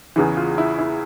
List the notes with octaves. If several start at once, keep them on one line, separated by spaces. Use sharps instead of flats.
E2 C#3 E3
F4
E4
E4